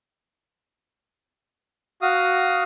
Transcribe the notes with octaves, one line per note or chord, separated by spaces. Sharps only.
F#4 F5 D#6